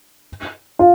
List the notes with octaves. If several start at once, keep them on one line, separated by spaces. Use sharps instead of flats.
F4